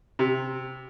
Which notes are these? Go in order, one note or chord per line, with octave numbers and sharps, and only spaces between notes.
C3